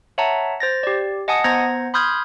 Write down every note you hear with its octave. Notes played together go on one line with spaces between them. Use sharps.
C#5 E5 F#5 A5 A#5
C5 A6 A#6
G4 D5
D#5 F#5 G#5 A5 D#6 C#7
B3 C5 F#5 A#5 G#6 A#6
B5 C6 D#6 F6 G6 G#6